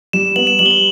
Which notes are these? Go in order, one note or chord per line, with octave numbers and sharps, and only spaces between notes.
G3 E7
B3 F#7
E7
G3 F#7
G7
F#7